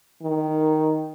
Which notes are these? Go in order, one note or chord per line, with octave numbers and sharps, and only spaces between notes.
D#3